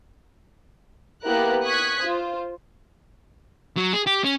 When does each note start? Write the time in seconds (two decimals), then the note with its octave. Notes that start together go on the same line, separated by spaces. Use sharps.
1.24 A#3 B3 E4 G4 A#4 F#6
1.63 C#6 D#6 F#6 G#6 B6
2.01 F4 C5
3.77 F#3
3.93 G#4
4.07 G4
4.24 C#4